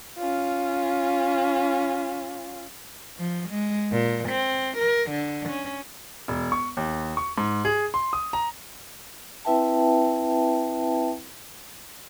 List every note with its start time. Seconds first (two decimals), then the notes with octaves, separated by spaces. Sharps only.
0.18 C#4 F4
3.18 F3
3.50 G#3
3.92 A#2
4.29 C4
4.78 A#4
5.11 D3
5.49 C#4
6.28 E1
6.52 C#6
6.77 D#2
7.17 C#6
7.38 G#2
7.65 G#4
7.94 C6
8.13 D#6
8.33 A#5
9.45 C4 E4 B4 E5 G5 A5